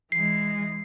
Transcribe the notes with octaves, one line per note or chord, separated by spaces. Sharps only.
E3 G#3 C7